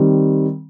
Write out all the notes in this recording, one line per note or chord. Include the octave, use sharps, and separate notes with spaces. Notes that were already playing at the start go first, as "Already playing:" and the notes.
Already playing: D#3 G3 C4